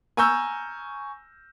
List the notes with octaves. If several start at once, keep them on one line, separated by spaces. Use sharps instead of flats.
G#5 A#5 C#6 E6 F6 G6